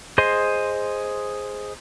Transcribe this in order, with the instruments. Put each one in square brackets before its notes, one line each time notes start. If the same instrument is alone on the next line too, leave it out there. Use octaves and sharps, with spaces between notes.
[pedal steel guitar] G#4 C5 D#5 C6